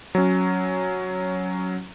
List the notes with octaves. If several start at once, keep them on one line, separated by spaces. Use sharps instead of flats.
F#3 C#4